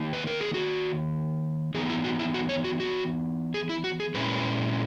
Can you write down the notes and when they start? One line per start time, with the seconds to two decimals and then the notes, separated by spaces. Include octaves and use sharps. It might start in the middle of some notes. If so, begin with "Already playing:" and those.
Already playing: D#3 A#3 D#4
0.13 B4
0.27 A#4
0.41 G#4
0.54 F#4
1.74 E3 B3 D#4 G#4
1.89 E4
2.04 F#4
2.19 E4
2.34 F#4
2.49 C#5
2.64 F#4
2.80 F#4
3.54 G#4
3.69 E4
3.84 F#4
4.00 G#4
4.15 A#2 G#3 C#4 E4 B4